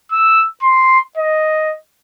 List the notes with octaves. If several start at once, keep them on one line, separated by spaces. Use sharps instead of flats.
E6
C6
D#5